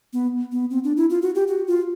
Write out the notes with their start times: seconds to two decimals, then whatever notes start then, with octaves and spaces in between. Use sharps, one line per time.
0.13 B3
0.52 B3
0.70 C4
0.84 D4
0.97 E4
1.10 F4
1.22 F#4
1.35 G4
1.47 F#4
1.67 F4